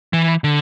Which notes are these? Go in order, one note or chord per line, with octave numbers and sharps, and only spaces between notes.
E3
D3